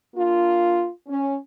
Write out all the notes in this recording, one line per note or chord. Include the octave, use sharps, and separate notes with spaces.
A#3 D4 F4
C#4